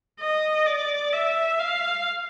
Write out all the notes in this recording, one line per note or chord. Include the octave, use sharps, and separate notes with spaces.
D#5
D5
E5
F5